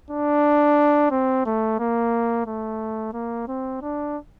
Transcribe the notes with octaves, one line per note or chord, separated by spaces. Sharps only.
D4
C4
A3
A#3
A3
A#3
C4
D4